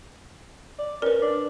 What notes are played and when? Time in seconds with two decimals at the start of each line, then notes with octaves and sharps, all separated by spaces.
0.79 D5
1.02 C#4 A#4 B4
1.22 D4